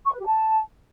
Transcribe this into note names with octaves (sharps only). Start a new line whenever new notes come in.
C#6
B4
G4
A5